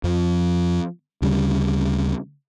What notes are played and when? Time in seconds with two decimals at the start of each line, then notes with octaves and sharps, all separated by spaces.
0.04 F2 F3
1.22 D2 C#3 G3